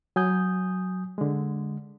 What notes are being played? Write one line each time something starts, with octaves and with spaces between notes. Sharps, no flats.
F#3 G#5 D#6 G6
D3 G#3